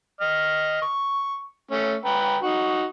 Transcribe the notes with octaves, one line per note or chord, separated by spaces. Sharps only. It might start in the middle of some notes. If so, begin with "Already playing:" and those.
D#5 F6
C#6
A3 C#4
B4 G5 A#5
D#4 F#4